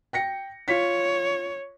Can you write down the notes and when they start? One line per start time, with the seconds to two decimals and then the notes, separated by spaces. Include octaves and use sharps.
0.13 G5 A#6 C#7
0.68 F4 C#5 B6